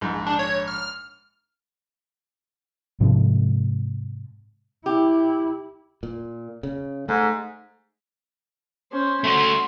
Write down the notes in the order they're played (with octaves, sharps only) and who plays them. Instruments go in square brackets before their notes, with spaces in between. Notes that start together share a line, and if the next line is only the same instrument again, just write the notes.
[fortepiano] A#1 G#2
[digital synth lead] D4
C#5
F6
[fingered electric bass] G#2 C3 F3 G#3
[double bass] E4 [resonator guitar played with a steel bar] G4
[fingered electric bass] A#2
C#3
[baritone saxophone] G#2 [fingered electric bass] A3
[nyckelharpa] C#4 C5
[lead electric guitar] A3 F#4 [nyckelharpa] C6